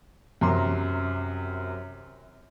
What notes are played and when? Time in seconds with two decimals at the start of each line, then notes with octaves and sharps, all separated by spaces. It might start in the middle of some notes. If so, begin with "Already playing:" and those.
0.41 F#2 C3 A#5 C6